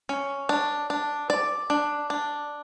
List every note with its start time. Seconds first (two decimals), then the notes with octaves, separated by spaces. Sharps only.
0.09 C#4
0.49 D4
0.90 D4
1.30 D5
1.70 D4
2.10 D4